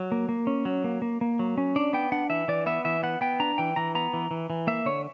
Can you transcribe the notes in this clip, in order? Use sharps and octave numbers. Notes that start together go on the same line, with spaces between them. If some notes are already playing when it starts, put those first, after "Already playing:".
Already playing: F#3
A#3
A#3
C#4
F#3
A#3
A#3
A#3
F#3
C#4
D4 D5
B3 G5
D4 F#5
E3 E5
E3 D5
B3 E5
E3 E5
B3 F#5
B3 G5
D4 A#5
E3 G5
E3 A#5
B3 A#5
E3
E3
E3
A#3 E5
D3 C#5